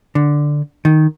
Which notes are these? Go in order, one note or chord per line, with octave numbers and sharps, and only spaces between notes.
D3
D#3